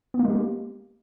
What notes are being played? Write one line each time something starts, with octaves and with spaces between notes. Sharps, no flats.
B3
A#3
G#3
G4
A#3